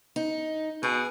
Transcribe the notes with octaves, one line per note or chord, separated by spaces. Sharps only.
D#4
B2 G#4